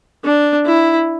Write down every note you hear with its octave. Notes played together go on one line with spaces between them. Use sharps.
D4
E4